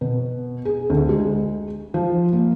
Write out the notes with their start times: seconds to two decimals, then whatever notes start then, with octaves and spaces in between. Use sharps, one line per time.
0.01 B2
0.65 G#4
0.90 D2
1.09 G#3
1.94 F3
2.33 A#3